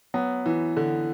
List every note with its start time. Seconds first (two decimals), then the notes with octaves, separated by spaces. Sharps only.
0.14 F#3 B3
0.46 E3
0.77 D3